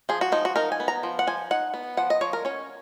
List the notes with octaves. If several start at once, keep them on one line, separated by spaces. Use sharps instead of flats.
F3 G#4
F#4
F3 D#4
F#4
D#4 A#4
G#5
B3
A#5
F3
F#5
F3 G#5
D#4 F#5
B3
F3 F#5
D#5
F3 C#5
A#4
C#4 C#5